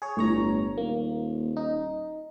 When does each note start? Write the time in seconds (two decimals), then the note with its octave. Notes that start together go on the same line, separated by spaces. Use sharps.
0.02 G#4 C#5
0.17 G1 A2 C#5 A#5
0.78 D#1 A#3
1.57 D#4